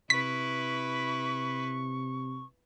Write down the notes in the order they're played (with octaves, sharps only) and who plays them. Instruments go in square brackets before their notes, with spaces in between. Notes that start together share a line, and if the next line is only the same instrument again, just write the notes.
[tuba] C3 [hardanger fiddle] E4 B4 [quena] C#6 [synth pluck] B6